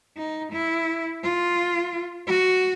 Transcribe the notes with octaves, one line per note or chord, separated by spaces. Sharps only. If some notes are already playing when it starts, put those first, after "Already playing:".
D#4
E4
F4
F#4